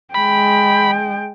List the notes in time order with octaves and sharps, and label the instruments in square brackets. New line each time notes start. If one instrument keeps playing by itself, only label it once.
[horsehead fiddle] G#3 G5 [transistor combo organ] B5